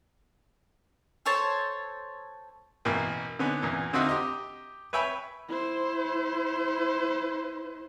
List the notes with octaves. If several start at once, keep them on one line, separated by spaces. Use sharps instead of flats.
A4 C5 C#5 A5
A1 B2 E3 A#3 G5
D3 B3 C#4 D#4
E2 A#2 E3
D3 C4 D#4 F4 F#4 E5
G4 D#5 A#5
B4 C#5 E5 G5 G#5 B5
E4 C5